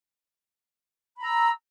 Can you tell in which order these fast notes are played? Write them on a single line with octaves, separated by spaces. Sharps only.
B5 A#5 E6